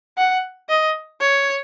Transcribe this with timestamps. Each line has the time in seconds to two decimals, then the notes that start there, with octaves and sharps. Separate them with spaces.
0.17 F#5
0.69 D#5
1.21 C#5